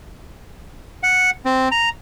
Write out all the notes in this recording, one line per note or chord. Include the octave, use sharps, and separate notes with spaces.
F#5
C4
A#5